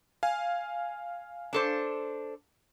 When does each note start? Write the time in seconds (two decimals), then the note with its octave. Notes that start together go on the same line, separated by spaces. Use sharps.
0.23 F5 G#5
1.53 D4 A4 C5